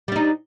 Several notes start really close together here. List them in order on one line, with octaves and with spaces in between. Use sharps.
G3 D4 D#4